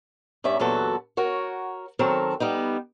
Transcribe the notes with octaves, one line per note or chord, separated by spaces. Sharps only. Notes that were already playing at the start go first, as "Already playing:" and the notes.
G2 C#4 D5 E5
E2 A#2 F#3 F#4 A4 B4
F#4 A#4 C#5
D#3 F#3 C4 A4 A#4
G3 B3 D#4